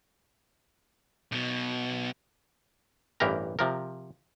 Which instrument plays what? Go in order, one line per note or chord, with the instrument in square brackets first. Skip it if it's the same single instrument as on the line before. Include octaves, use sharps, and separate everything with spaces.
[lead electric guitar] B1 B2
[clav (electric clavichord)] A1 G2 E3 G4 A#4 A#5
C3 F3 A#4